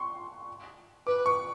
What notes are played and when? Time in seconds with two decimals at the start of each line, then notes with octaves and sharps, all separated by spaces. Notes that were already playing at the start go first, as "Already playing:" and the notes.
Already playing: C6 C#6
1.07 B4 D6
1.26 C#6